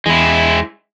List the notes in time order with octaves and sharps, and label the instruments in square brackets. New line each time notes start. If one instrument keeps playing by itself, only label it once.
[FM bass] E2 [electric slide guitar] G#3 E4